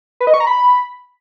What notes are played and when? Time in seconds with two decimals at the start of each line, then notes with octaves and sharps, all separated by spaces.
0.20 B4
0.27 D#5
0.34 C#6
0.40 A#5
0.47 B5